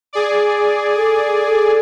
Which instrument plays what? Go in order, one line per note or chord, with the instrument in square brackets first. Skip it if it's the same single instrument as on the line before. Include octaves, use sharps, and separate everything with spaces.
[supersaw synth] G#4 D5
[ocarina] A4